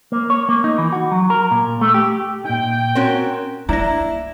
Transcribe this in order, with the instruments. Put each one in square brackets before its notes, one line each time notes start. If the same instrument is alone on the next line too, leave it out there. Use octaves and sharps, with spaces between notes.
[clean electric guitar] A#3
C#5
A#3
D#4
E3
F#4
F#3
A#4
A#2
A3
G4
[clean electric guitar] A#2 D#4 [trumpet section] G5
[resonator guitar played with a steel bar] C4 C#4 F#4 [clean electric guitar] A#4
[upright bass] A#3 [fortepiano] D4 [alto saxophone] E4 [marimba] A#5 A#6